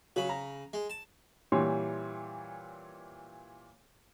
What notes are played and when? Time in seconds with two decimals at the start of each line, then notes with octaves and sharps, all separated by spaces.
0.16 C#3 F#3 B5
0.29 A#5
0.73 G#3
0.90 A5
1.52 A#2 E3 G3 G4 C#5 C6